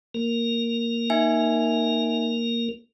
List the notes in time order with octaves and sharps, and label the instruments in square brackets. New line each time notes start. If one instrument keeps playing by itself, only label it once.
[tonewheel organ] A#3 A#4
[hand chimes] D#4 E5 G#5